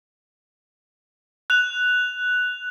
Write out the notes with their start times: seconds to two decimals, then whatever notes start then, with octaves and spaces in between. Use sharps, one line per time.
1.50 F#6 F7